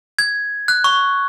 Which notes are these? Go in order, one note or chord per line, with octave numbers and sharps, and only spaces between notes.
G#6
F#6
C#6